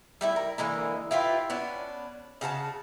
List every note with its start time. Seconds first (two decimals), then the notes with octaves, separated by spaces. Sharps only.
0.21 G3 A3 E4
0.36 A#4
0.58 D3 E3 G#3 A#3
1.11 E4 F4 G4 B4
1.50 B3 C#4 D4
2.41 C#3 F#4 C5 A5